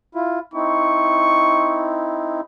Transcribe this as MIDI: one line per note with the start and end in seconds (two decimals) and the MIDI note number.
0.15 0.39 64
0.15 0.39 65
0.54 2.41 60
0.54 2.41 63
0.54 2.41 64
0.54 1.95 85